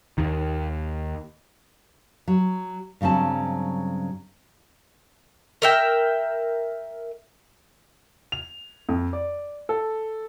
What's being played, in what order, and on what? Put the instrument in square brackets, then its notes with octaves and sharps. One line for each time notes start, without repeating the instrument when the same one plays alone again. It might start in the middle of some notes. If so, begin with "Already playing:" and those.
[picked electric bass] D#2 D#3
[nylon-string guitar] F#3
G2 C#3 F#3 C4 A5
[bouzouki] A#4 E5 G5
[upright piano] F7
F2
D5
A4